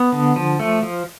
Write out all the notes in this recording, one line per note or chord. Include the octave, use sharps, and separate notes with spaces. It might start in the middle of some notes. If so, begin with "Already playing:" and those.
Already playing: B3
D3
F3
A3
F3